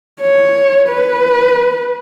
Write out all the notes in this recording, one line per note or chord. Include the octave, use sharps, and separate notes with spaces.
C#5
B4